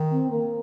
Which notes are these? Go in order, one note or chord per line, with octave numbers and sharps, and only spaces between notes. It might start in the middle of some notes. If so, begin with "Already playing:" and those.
Already playing: D#3
C4
A#3